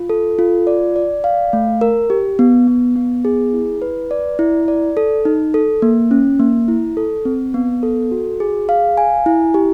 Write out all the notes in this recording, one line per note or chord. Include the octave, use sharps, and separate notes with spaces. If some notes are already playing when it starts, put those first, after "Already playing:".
Already playing: F4
A4
F4
D5
D5
F5
A3
A#4
G4
B3
B3
B3
G#4
E4
B4
D5
E4
D5
A4
D#4
A4
A#3
C#4
A#3
E4
A4
C4
B3
A4
F#4
G#4
F5
G#5
E4
G4